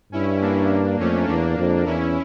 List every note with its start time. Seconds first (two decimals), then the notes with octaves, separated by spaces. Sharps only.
0.12 G2 C#4 E4
0.41 A#3 D4
0.99 F2 A3 C#4
1.28 E2 A#3 D4
1.58 F2
1.86 E2 C#4 E4